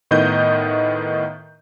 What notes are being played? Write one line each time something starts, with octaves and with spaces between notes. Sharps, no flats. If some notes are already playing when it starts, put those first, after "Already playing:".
A2 D#3 B3 D#5 G6